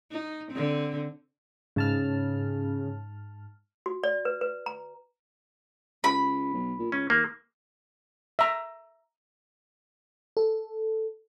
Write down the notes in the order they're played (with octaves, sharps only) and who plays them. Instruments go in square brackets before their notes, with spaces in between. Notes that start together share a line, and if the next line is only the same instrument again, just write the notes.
[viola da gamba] D#4
D3 C4
[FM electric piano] G#2 A5 F6 [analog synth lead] C#3
[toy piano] F#4
D5
B4
B4
A#5
[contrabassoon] C#2 [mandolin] B5
[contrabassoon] B1
A#2
[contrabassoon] C#2 [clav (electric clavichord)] C#4
[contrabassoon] D#2 [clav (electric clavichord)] A#3
[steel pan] E5 A#5
[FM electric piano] A4